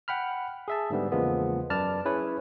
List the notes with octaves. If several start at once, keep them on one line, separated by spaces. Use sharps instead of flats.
F#5 G5 B5 F6
G#4 E5 A5
G#2 D3 G3 B3
E2 C#3 F3 G#3 A#3 B3
F#2 B4 D5 A5 F6
C#4 E4 G#4 B4 C#5